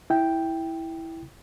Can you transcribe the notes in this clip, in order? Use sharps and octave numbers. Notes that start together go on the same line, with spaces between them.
E4 G5